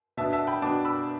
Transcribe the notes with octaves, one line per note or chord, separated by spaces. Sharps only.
B2 B3 D4 E5 A5
E5 A5
G5 B5
B2 B3 D4 A5 D6
B5 E6